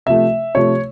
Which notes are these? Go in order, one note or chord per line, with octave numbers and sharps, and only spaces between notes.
C3 F3 A3 E5
C3 F3 A3 C#5